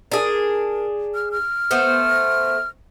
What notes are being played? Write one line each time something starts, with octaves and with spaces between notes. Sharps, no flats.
D4 G#4 A#4
F6
F6
A3 B3 C5